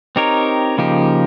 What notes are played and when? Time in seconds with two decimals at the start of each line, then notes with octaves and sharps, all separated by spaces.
0.16 C4 D#4 G4 A#4 C#5
0.78 C#3 F3 A#3 D#4 G4